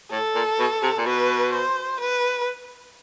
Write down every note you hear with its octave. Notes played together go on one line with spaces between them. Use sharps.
A2 A4
A#2
B2
C3
A#2
B2 B4
C5
B4